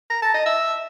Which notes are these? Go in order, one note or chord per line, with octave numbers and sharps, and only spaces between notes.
A#5
A5
D#5
E5